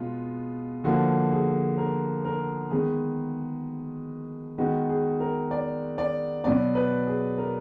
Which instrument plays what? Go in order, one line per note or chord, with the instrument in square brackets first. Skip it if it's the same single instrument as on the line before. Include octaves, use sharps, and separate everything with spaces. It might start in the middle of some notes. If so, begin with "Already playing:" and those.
Already playing: [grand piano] B2 G#3 B3 F4
D3 F3 A#3 F#4
G#4
A#4
A#4
D#3 G#3 B3 G#4
D#3 G#3 B3 F#4
G#4
A#4
D5
D5
B2 F#3 B3 D5
B4
G#4
A#4